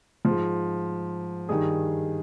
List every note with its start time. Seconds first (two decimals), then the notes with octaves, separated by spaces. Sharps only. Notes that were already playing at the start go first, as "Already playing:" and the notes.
0.25 F3
0.30 G#2
1.49 G2 D#3 G#4